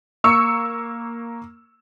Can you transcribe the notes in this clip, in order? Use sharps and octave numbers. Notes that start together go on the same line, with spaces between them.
A#3 C#6 E6 C#7